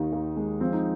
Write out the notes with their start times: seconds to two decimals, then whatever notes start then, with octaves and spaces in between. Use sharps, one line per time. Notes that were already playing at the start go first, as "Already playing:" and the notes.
Already playing: D#2 D#3 D#4
0.13 D#2
0.37 G#3
0.61 F3 C4
0.72 D#4